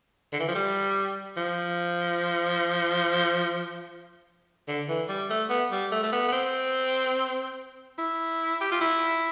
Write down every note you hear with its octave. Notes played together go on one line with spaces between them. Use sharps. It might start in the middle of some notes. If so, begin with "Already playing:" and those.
D3
E3
F3
G3
F3
D3
E3
G3
A3
B3
G3
A3
A3
B3
B3
C4
E4
G4
F4
E4